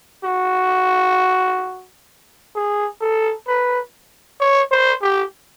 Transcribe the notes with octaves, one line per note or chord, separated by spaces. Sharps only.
F#4
G#4
A4
B4
C#5
C5
G4